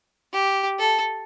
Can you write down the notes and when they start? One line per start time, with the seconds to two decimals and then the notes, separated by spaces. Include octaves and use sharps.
0.33 G4
0.79 A4